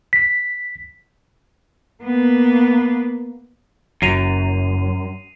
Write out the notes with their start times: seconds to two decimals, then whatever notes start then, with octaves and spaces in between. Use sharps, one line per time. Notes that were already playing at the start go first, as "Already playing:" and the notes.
0.13 B6
2.03 A#3 B3
4.02 F#1 F#2 F#3 C7 D#7 F7